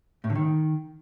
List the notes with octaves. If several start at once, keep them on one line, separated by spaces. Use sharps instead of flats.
A2
D3
D#3